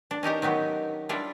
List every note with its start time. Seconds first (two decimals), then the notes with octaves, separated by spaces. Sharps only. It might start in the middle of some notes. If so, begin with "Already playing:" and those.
0.11 D4
0.23 C#4 D#4 G4 A#4
0.42 D#3 F#3 B3 G4
1.09 G3 D4 E4 F4